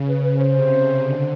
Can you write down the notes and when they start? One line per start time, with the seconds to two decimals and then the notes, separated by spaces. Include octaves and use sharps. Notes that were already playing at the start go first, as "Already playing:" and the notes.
Already playing: C#3
0.09 B4
0.24 B4
0.39 C5
0.53 C3
0.99 D3